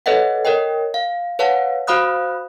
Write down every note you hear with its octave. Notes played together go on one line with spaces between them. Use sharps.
A4 B4 C#5 D#5 E5 F#5
A#4 C#5 D#5 G5
F5
B4 C#5 F5 F#5 A5
F#4 C5 F5 B5 D#6 F#6